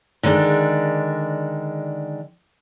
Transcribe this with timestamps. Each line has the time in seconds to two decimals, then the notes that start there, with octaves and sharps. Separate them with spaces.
0.23 D3 D#3 G#3 C4 D4